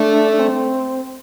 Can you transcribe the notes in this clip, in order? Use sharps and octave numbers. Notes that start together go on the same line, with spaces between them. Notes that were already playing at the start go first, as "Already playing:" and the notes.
Already playing: A3 D4
D4
C4